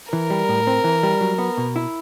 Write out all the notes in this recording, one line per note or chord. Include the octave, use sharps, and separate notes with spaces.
E3 A#4
G3
A2
C4
E3
G3
F#3
B3
B2
E4